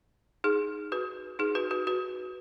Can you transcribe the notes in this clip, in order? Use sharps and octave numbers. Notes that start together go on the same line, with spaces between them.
D#4 G#4
F#4 B4
D#4 G#4
F#4 B4
F#4 B4
F#4 B4